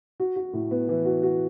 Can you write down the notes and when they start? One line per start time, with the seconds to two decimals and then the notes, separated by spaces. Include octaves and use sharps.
0.20 F#4
0.36 F#4
0.53 A2
0.71 B3
0.89 E3
1.05 F#4
1.23 F#4